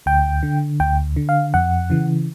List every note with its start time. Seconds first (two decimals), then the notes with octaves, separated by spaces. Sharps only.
0.06 D2 G5
0.43 D3
0.80 D2 G5
1.16 D3
1.29 F5
1.54 F2 F#5
1.90 C#3 E3